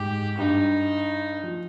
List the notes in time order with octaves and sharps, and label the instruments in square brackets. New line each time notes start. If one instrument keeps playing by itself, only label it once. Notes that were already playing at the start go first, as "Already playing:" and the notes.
Already playing: [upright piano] G#2 [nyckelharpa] G4
[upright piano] G2 [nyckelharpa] D#4
[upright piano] F3